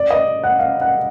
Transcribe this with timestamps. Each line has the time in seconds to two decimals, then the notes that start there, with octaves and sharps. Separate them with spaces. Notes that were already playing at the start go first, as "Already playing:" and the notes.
Already playing: D5
0.10 D#5
0.44 F#5
0.59 F5
0.81 F#5